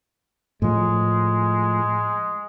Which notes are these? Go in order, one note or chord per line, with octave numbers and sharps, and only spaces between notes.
A2 F3 G#3